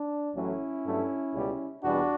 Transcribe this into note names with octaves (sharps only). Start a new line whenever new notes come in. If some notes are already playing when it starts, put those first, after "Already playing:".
Already playing: D4
A1 A2 F#3 A3 C#4 E4
G2 F#3 A3
C#2 B2 G3
E2 B2 G3 B3 D4 F#4